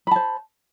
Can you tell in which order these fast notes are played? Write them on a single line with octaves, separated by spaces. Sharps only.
B5 A5 C5